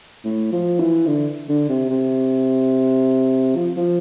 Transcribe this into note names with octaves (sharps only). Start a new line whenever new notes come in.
A2
F3
E3
D3
D3
C3
C3
F3
F3